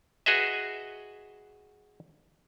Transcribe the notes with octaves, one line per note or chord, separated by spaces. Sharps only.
F#4 G#4 B4 D#5 E5